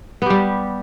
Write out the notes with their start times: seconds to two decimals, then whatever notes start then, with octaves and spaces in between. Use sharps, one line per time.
0.22 B3
0.26 G4
0.30 G3